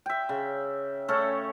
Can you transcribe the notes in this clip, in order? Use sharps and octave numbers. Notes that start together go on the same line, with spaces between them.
E5 G5
C#3
A3 C#4 A4 C#5